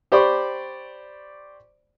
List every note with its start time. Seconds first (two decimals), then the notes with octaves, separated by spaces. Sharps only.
0.12 G4 C5 D5 B5 C#6 D6